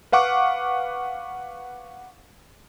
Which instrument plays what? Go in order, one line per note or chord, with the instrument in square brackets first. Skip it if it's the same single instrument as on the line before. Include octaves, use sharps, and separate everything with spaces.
[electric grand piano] B4 F5 F#5 C#6 D6